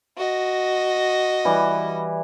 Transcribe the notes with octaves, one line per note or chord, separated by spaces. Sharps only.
F#4 D#5
E3 G3